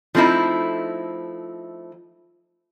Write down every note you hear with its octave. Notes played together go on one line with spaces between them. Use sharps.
F3 A3 C4 D#4 E4